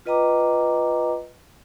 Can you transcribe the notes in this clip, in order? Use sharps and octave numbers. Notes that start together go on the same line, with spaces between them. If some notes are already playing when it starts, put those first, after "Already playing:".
F4 B4 D#5 G5 A#5 D6